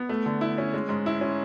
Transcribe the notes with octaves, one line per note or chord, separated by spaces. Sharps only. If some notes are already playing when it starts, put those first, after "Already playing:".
Already playing: B3
A3
D3
E4
C#4
G#3
G#2
E4
C#4